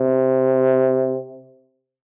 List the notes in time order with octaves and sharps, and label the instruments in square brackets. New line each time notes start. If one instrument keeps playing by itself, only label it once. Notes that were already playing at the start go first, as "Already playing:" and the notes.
Already playing: [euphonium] C3